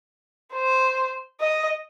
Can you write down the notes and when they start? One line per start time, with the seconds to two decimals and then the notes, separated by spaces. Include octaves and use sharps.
0.54 C5
1.40 D#5